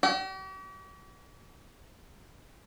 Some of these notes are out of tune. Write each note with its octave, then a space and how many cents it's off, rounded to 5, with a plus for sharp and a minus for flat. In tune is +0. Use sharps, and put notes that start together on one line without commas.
G4 -45